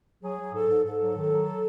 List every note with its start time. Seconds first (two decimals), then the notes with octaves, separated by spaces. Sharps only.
0.23 F#3 G#4
0.39 F#3
0.53 G#2 A4
0.69 G#2
0.85 G#2 A4
1.00 F#3
1.16 D#3
1.30 F#3